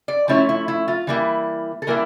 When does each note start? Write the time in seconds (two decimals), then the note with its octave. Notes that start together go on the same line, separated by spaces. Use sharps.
0.08 D5
0.28 F3 A3 C#4 E4 C#5
0.49 E4
0.68 E4
0.88 F4
1.07 E3 G3 A#3 E4
1.82 A4
1.87 E3 G3 A#3 E4 A#4